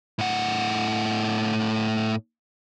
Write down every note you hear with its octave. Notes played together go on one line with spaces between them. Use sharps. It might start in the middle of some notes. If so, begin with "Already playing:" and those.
A2 F#5